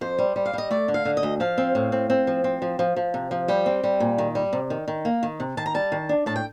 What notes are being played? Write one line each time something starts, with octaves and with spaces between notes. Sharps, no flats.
F2 C5
G3
G3
F5
G3 D#5
A3 D5
D3
F5
D3
D#5
D2
F3 F5
C4
A2
C4
C4
F3
C4
F3
F3
F3
C3
F3
G3 G5
C4
G3
A#2
D#3
G3
C3
D#3
D#3
A#3
D#3
C3
D#3 A5
A#5
G3 A5
D#3
D4
A2 A5
G5